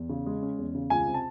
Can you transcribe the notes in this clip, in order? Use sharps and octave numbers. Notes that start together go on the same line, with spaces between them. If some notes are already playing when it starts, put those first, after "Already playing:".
Already playing: E2
C#3
G#3
C#4
E2
C#3
C#2 G#5
C3
A5